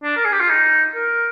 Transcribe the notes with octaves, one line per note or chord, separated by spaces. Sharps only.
D4
A#4
G#4
G4
F4
D#4
A#4